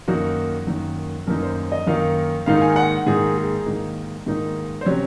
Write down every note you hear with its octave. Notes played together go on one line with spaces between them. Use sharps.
F#2 D#3 A#3 D#4 F#4
F#2 D#3 A#3 D#4
F#2 D#3 A#3 D#4 A#4
C5
D#5
F#2 D#3 A#3 D#4 F5
G#2 D#3 A#3 D#4 F5
G#5
F#5
G#2 D#3 A#3 D#4 G#4
G#4
G#2 D#3 A#3 D#4
G#2 D#3 A#3 D#4
C5
C3 F#3 C#4 C#5